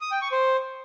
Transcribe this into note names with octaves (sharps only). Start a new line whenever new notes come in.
D#6
G5
C#6
C5